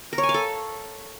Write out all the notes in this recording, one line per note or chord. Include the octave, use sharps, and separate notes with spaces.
A#4
C#5
G#5
F5
A4